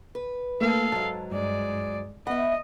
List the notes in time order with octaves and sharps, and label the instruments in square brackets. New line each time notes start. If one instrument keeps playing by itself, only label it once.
[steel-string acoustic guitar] B4
[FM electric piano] A3 A#3 [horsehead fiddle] A4 F5
[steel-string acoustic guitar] G#2 F#3 [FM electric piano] A5
[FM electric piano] G2 [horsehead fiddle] G#3 D5
[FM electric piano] B3 B5 [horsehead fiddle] D#5 [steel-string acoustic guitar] E5 F#5